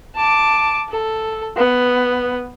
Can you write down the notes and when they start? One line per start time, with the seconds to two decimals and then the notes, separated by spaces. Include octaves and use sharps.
0.15 A5 D6
0.90 A4
1.57 B3